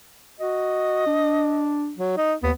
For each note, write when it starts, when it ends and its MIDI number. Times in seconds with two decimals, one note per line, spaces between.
0.40 1.04 66
0.40 1.76 75
1.06 1.93 62
1.98 2.15 54
2.17 2.34 63
2.43 2.52 39
2.43 2.52 59